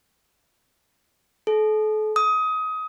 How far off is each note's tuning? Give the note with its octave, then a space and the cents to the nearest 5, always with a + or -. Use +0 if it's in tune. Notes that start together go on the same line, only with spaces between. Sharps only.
A4 -40
D#6 +25